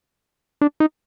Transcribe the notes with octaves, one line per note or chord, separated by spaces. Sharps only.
D4
D#4